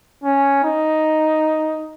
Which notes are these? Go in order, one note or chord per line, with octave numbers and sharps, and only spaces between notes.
C#4
D#4